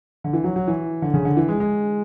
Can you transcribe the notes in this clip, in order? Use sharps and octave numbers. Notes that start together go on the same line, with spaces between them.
D3
E3
F#3
F#3
E3
D3
C#3
D3
E3
G#3
G#3